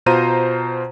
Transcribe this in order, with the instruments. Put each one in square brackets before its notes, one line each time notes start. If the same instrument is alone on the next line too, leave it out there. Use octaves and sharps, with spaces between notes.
[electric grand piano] B2 F4 C5 A#5 D#7